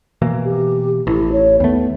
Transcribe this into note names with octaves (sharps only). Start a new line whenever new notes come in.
B2 E3 A#3
G4
A1 E4
C#5
D#2 A3 B3